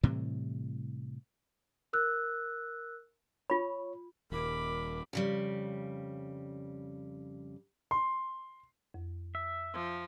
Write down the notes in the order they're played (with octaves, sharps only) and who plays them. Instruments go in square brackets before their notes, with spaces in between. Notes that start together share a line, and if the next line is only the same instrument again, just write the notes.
[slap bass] A2 C3 E3 G3
[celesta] A#4 E6 F#6
[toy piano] F4 B5 [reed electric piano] C#5
[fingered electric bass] D#1 [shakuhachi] A#4 [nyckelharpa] B5 D6
[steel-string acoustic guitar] F2 C#3 G3
[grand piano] C6
[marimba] F2
[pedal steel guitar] E5
[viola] F3